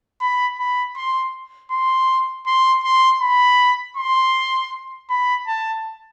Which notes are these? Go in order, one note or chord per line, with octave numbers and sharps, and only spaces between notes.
B5
B5
C6
C6
C6
C6
B5
C6
B5
A5